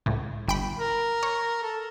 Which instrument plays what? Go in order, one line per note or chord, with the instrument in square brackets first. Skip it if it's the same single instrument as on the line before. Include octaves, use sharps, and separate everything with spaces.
[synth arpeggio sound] C#2 A2
G1 G5 B5
[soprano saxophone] A#4
[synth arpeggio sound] C#5
[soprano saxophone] A4